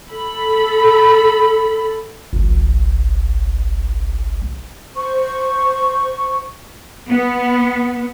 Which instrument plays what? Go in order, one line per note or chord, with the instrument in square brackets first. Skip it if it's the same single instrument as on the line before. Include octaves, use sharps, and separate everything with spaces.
[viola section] A4 B5
[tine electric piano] G1 C2
[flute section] C5 C#6
[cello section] B3